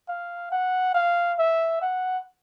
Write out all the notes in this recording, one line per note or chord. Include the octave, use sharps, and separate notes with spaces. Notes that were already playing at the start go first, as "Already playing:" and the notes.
F5
F#5
F5
E5
F#5